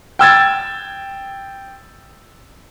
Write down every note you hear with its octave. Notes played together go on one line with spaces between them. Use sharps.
G5 E6 G#6 A6